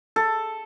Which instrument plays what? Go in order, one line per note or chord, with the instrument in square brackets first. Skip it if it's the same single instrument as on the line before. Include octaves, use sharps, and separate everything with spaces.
[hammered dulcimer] A4